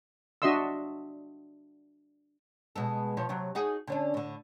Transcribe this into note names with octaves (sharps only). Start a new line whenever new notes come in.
D4 F#4 D#5 E5 C6 E6
B2 G#3 A4
B2 F3 C#5
C3 F#3
D#4 F#4 G#4
D3 C#4 D4
A2 D3